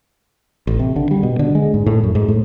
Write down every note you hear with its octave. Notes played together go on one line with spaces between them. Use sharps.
A1
C3
D3
G3
B2
D3
G#3
G#2
A2
F#2
G#2
A2